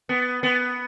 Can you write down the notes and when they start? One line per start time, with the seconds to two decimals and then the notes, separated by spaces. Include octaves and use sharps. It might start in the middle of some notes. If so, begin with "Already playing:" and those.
0.09 B3
0.43 B3